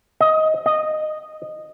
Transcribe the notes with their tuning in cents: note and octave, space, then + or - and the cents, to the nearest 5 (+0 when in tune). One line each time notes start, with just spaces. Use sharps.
D#5 +15
D#5 -10